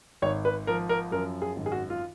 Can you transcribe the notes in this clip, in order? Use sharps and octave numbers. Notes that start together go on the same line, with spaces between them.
G#1 C#5
B4
F3 A#4
A#4
F#2 A#4
G#4
G#1
G#4
F#4
F4